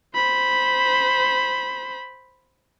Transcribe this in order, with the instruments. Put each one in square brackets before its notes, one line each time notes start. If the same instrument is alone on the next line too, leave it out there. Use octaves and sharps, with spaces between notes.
[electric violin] C5 B5